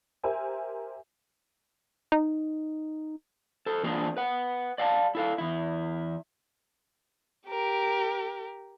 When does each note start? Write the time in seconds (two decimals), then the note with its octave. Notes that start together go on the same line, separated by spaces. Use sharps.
0.23 G4 A#4 C5 E5 G#5
2.12 D#4
3.66 A4 C5
3.83 E3 A#3 C4 D4 F4 G#4
4.17 B4 F#5
4.78 D5 F5 G5 A5
5.15 E4 A4 F5
5.38 E2 E4
7.48 G4 A#4